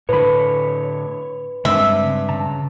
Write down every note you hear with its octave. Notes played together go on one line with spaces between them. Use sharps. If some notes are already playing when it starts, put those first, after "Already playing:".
A2 D3 B4 C#5 B5
G2 C#3 G#3 C4 E5
C#3 A5 A#5